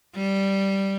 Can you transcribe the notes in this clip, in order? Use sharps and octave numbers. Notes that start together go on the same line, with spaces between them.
G3